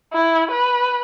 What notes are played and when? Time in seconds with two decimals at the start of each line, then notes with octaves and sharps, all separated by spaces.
0.13 E4
0.51 B4